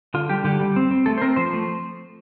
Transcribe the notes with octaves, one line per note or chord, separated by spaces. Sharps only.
D3 F4
G3 G4
D3 G4
G3
C4
C4
A3 A4
C5
C4 A#4
F3 C5
A3